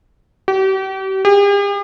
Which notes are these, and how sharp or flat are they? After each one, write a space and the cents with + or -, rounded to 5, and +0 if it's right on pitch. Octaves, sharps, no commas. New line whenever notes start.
G4 -40
G4 +45